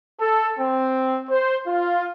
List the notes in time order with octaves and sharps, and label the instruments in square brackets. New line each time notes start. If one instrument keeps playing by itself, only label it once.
[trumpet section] A4
C4
C5
F4